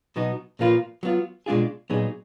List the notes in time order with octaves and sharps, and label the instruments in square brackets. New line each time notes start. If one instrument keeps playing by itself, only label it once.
[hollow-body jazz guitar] B2 F#3 B3 D#4
A#2 F3 A#3 F4 B4
F#3 B3 F4
B2 G#3 D4 F4 G#4
A#2 F#3 B3 D#4 G#4